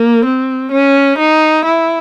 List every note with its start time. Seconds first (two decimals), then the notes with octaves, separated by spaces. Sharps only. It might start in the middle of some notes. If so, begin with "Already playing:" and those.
Already playing: A#3
0.25 C4
0.72 C#4
1.18 D#4
1.65 E4